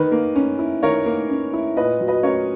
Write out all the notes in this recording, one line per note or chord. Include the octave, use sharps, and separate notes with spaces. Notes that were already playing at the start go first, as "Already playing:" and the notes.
Already playing: D#3 B4
A#3
C#4
E4
D#3 A#4 C#5
A#3
C#4
E4
A#2 B4 D#5
F#3
B4 D#5
C#4 A#4 C#5